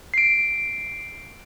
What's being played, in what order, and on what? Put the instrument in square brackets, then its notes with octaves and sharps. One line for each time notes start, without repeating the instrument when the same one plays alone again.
[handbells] C7 D7